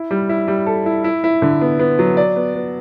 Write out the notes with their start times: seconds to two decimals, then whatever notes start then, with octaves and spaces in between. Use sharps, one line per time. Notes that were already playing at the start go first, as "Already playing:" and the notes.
Already playing: E4
0.11 G3
0.29 E4
0.48 G3
0.66 A4
0.86 E4
1.04 E4
1.24 E4
1.42 D3
1.61 B3
1.79 B3
1.99 F#3
2.17 D5
2.36 B3
2.55 B3